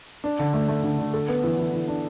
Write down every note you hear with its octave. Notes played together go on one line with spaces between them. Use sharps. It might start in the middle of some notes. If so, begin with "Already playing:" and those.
D4
D3
A3
A3
D3
D3
A4
B3
E3
E3
E3
D4